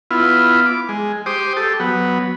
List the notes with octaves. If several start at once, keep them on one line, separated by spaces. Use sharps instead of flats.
B3 E4 F4
D6
G#3
G4 C5 D6 D#6
G4 A4
F#3 B3